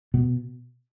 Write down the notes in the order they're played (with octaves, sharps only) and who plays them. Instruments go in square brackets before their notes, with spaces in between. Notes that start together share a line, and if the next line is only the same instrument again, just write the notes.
[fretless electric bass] B2 B3